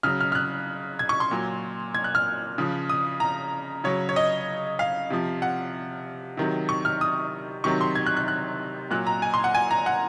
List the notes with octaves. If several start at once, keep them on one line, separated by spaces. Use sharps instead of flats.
C#3 F#3 F6
F6
F6
F#6
G#6
C#6
C6
A#2 F#3
G#6
F#6
F6
C#3 F3
D#6
A#5
C#3 F#3 C#5
C#5
D#5
F5
C3 F3
F#5
C3 D#3 F#3
C#6
F6
D#6
C3 D#3 F#3 C#6
C6
G#6
F#6
F#6
F#6
A#2 F#3 F#6
A#5
G#5
C6
F#5
G#5
A#5
F#5